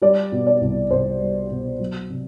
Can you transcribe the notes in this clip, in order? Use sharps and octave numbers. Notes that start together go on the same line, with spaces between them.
G3 D5
B2
D5
C2
C2 C5
G3
B2
F#3
C3